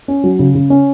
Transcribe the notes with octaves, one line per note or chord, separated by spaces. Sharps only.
C#4
F#3
C#3
C#3
C#4